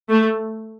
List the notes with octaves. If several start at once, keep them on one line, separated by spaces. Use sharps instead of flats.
A3